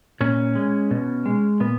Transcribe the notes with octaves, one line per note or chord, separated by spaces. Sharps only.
A#2 C#4
G#3
B2
G#3
A#2 B3